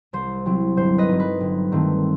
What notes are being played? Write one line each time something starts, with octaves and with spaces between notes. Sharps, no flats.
C2 C5
C3 F#3 C4 E4
G1 C5
B4 D#5
G2 F#3 C4 D#4
B4
G1
G2 D#3 A3 C4